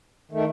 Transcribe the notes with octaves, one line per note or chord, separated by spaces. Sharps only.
D#3 A3